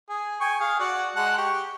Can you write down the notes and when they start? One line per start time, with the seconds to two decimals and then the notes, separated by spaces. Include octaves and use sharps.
0.09 G#4
0.41 G5 G#5 C#6
0.60 G#4 F5
0.80 F#4 D5 F#5
1.16 G#3 F#5 A5
1.38 G4 C#6